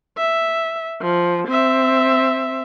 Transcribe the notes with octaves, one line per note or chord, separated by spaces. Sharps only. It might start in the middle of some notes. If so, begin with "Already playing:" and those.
E5
F3
C4 E5